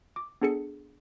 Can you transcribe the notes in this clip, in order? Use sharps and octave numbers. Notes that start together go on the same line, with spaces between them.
D6
B3 D4 G#4 A4 C#7